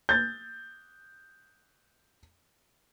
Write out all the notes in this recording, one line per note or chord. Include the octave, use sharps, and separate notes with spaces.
G6 A6